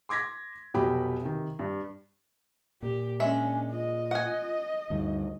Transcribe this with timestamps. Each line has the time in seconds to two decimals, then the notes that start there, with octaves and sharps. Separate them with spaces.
0.09 C6 D6 G#6 A#6 B6
0.74 F1 B2 F#3 G4 G5 B5
1.21 C3 D#3
1.59 G2
2.83 A#2 G4
3.20 G#3 C#4 D4 E5 G#5
3.71 F4 D#5
4.11 F#5 G#5
4.90 D2 G2 D#4